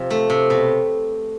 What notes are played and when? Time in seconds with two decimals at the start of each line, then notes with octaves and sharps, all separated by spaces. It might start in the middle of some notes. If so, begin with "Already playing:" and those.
Already playing: C3 F3
0.11 A3
0.30 C3
0.50 B2